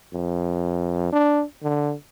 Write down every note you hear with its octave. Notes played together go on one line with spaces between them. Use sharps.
F2
D4
D3